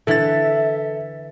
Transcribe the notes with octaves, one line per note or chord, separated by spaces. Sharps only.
D3 E3 A4 E5 A6